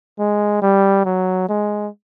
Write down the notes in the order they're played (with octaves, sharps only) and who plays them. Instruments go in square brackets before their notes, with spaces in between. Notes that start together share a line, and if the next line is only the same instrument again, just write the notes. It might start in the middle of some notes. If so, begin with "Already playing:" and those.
[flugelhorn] G#3
G3
F#3
G#3